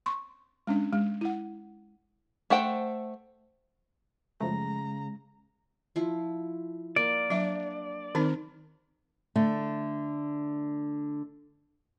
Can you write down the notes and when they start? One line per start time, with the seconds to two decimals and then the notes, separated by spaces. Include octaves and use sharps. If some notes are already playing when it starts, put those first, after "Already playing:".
0.06 C6 C#6
0.67 G#3 C#4 D4
0.93 G#3
1.21 E4 F#5
2.50 A3 C5 F#5 G5
4.40 F#2 C#3 F3 G#3 A3 A#5
5.96 F3 E4
6.96 A#3 D5
7.30 F#3 D4 E5
8.15 D#3 C4 D#4 A#4
9.36 D3 A3